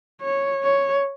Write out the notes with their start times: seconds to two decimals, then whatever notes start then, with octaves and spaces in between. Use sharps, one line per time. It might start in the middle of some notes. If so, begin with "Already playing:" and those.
0.21 C#5
0.63 C#5